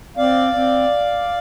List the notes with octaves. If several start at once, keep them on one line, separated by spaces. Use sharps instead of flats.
C4 D5 F5
C4